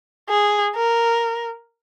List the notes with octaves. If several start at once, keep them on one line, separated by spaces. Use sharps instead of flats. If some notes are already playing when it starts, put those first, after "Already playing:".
G#4
A#4